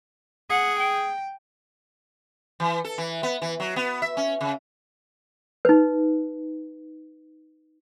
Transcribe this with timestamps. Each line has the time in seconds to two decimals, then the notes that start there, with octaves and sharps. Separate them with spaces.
0.50 G#4 F#5
0.79 G5
2.60 E3
2.84 A4
2.98 E3
3.23 B3
3.42 E3
3.60 F#3
3.76 B3
4.02 E5
4.17 C#4
4.41 C#3
5.65 D#4 B4